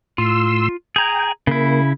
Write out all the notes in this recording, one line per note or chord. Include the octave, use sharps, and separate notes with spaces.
A2 F4 C6 E6
G#4 G5 G#5 A#5
C#3 A#3 E4